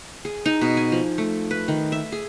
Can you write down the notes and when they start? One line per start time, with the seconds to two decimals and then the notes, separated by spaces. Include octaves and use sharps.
0.25 G#4
0.46 D#4
0.62 B2
0.77 G#5
0.92 F3
1.18 A3
1.51 B4
1.68 D#3
1.92 E5
2.12 G#4